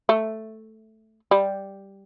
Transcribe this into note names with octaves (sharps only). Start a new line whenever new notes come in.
A3
G3